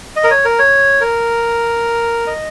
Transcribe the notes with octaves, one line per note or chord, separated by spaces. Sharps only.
D#5
A#4
C#5
A#4
C#5
A#4
D#5